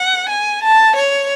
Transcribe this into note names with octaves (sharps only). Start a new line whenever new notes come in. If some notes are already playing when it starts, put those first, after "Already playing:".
Already playing: F#5
G#5
A5
C#5